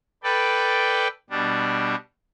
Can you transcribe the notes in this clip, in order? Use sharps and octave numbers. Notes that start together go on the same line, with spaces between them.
A4 B4 D5 G5
B2 G3 D4